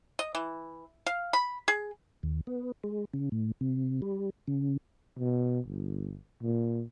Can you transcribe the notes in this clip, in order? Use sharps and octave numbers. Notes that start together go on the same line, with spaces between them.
D#5
E3
F5
B5
G#4
D#2
B3
G#3
C#3
A2
C3
G3
C#3
B2
G1
A#2